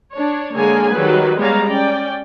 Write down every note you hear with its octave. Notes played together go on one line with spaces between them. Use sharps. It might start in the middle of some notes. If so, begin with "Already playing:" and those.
D4 C#5
D3 G#3 A#3 G#4 C#5 G#5
D#3 F#3 G3 B4
G3 G#3 B3 C#5 F5 A#5
C#4 D5 G5